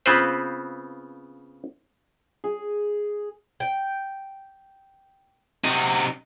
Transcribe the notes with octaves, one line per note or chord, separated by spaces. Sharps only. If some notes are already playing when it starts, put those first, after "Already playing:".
C#3 B3 C4 F4 B4 C5
G#4
G5
C3 D#4 F#4